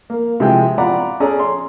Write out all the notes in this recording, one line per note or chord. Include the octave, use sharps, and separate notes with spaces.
A#3
C3 E3 F3 G#3 G#4 G5
F4 D5 F#5 A#5 B5 D6
C#4 G#4 A4 D5 A#5
C6